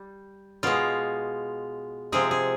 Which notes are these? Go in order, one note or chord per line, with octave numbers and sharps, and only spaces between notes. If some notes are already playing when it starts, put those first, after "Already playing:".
Already playing: G3
B2 G#3 F4
C3 F3 G#3 G#4
G#4